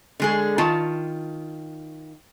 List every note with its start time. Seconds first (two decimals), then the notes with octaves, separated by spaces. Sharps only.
0.20 D3 G#3 G#4
0.58 D#3 F4 A5